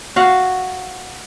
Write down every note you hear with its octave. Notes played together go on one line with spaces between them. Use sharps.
F#4 F5 F#5